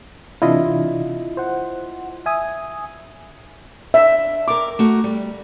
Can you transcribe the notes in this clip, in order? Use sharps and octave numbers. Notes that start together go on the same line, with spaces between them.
C3 E3 D4 E4 F4 D#5
C5 F#5
E5 G#5 D#6
D4 E5
A#4 F5 D6
A3 F#4 A#4
G3